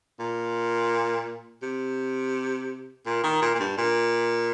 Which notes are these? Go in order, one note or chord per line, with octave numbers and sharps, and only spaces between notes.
A#2
C3
A#2
D#3
A#2
A#2
G2
A#2